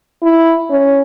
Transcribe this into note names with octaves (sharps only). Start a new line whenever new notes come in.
E4
C#4